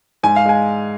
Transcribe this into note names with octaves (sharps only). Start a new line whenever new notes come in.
G#2 G#5
F5
G#3 G#5